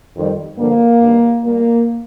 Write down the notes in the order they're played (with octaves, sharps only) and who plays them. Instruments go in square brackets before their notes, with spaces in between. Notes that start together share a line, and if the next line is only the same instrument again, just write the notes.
[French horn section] F2 D#3 G3
G2 D3 F3 A#3
G2 D#3 G3
A#2 G3 A#3